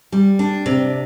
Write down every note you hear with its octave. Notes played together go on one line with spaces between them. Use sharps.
G3
D4
C3